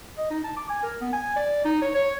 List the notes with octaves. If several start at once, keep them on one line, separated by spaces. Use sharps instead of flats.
D#5
D#4
A5
D6
G#5
A#4
B3
G#5
D5
D#4
C#5
C#5